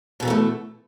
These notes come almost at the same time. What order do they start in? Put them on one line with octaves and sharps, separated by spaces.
B2 D3 E3 A#3 A3